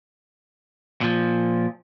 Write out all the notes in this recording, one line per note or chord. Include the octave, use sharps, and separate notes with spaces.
A#2 F3